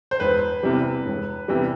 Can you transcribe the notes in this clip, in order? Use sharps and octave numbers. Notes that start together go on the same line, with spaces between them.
C5
E1 B4
E2 C3 E3 G3
E1
E2 C3 E3 G3